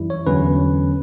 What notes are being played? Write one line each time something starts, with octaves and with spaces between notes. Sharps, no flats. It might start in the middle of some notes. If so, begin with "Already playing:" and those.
Already playing: F#2 E3 G3 E4
C#5
E2 D3 F#3 C#4 B4